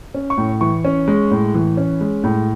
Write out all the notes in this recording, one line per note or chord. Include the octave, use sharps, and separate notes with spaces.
C#4
C#6
A2
E3 C#6
C#4
G#3
A2
E3
C#4
G#3
A2